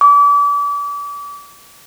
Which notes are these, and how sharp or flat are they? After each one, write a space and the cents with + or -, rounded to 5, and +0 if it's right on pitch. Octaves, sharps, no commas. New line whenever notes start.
D6 -35